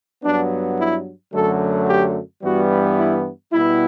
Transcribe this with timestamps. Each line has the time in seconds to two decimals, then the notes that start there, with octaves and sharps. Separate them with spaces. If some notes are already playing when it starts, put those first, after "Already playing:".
0.23 G2 F#3 B3 D4
0.78 E4
1.33 F#2 D3 F#3 A3 A4
1.87 G4
2.42 G2 E3 G3 B3 F#4
2.97 E4
3.52 B2 G3 B3 E4